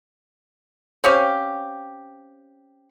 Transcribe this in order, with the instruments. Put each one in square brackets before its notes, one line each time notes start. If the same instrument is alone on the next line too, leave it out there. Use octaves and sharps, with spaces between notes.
[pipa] C4 C#4 G4 F5